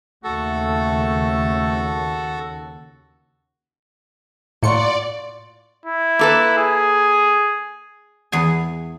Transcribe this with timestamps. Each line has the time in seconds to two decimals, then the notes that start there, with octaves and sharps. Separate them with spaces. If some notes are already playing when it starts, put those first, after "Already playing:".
0.24 D#2 C#3 A3 F#4 A4
4.63 A2 A#3 F4 F#4 D5 C#7
5.86 E4
6.19 A#3 A4 B4
6.58 G#4
8.32 E2 G#4 G#5